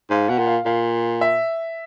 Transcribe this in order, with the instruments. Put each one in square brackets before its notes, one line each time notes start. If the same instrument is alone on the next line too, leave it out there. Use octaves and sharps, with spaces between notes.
[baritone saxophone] G#2 [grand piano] F5
[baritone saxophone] B2 [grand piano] F#5
[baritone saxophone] A#2
[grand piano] F5
[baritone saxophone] A#2 [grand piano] F5
[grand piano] E5